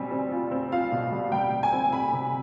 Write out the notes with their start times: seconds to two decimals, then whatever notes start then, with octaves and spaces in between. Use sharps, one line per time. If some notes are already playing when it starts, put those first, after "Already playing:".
Already playing: B2 G3 C4 G#5
0.11 C4
0.32 F4
0.51 C4
0.72 F4 F5
0.92 B2
1.12 G3
1.32 G3 G5
1.52 G3
1.63 G#5
1.72 C4
1.93 G3 B5
2.13 C3